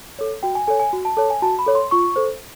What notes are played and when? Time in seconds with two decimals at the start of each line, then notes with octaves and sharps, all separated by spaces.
0.19 A4 C#5
0.43 F#4 G5
0.55 G#5
0.67 A4 C#5 G#5
0.80 G#5
0.93 F#4
1.05 A5
1.17 A4 C#5 A5
1.30 G#5
1.42 F#4 A5
1.59 B5
1.66 A4 C#5
1.75 C6
1.91 F4 C#6
2.16 A4 C5